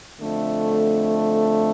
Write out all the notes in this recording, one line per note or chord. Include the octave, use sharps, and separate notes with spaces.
F2 D3 A3